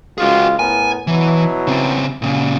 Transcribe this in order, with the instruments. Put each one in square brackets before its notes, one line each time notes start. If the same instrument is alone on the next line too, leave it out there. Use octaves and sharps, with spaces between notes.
[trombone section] C#2 G#3 F4 [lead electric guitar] F#4 G#4
[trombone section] A2 B3 A#4 [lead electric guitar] G#5
[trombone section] B2 F#3 E4 [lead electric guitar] E3
[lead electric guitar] C#3 C4
A#2 C#3